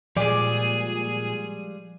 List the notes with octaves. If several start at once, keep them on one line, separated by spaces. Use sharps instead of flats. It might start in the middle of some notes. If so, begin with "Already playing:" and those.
A#2 F3 G3 G#3 G#4 D5